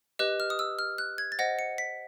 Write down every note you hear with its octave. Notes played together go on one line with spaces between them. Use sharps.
G4 B4 D#5 F#6
F6
D#6
E6
F6
F#6
G#6
A6
C5 D#5 F#5 A#6
C#7
B6